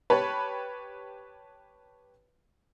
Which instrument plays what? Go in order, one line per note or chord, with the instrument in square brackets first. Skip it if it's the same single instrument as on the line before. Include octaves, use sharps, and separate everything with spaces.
[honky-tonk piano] G4 B4 C#5 A5 B5